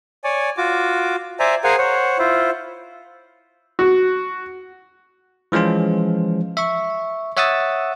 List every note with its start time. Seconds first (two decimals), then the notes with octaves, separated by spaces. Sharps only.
0.24 C#5 D5 G#5
0.57 F4 F#4 D6
1.40 C5 D5 E5 G#5 A#5
1.64 G#4 A#4 C5 F5 F#5 G#5
1.78 C5 C#5 F#5
2.19 E4 F4 C5
3.79 F#4
5.52 E3 F3 G#3 C#4 F4
6.57 E5 C#6
7.37 C#5 E5 F#5 D#6 E6 A6